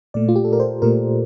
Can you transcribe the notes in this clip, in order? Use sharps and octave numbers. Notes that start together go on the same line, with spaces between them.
A#2 A3 D5
F4
G4
A4
A#4
C5
A#2 A3 A#4